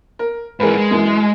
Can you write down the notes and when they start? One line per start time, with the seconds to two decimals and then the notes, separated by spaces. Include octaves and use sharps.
0.19 A#4
0.60 G#2 E3 G#4 A#4 B4
0.77 G#3
0.91 F#2 E3